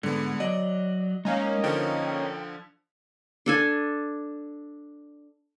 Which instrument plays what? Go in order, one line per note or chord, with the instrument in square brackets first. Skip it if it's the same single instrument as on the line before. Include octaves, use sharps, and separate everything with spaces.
[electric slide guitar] G#2 G#3 [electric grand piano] D3 B3
[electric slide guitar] F#3 D5 [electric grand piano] D#5
[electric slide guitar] G#3 [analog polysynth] A#3 C#4 D#4
[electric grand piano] D3 F3 [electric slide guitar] G5
[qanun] D4 A4 G#5